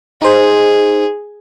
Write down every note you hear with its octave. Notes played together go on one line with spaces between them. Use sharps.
D#4 G#4 C5